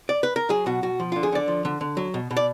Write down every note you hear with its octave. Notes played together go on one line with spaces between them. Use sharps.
D5
B4
A#4
F#3 G#4
B2 F#4
B2 F#4
F3
D3 F4
G#4
D3 D5
F3
D3
D3
F#3
B2
B2
D5